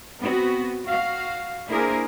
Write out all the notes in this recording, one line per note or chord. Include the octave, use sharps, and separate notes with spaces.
B3 C4 F#4
F#4 F5
A#3 D4 E4 G#4 A#4 C5